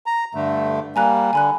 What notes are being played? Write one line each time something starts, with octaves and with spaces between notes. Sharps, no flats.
A#5
G2 D3 A3
G3 A#3 G#5 A#5 F#6
D3 G#5 B5 F#6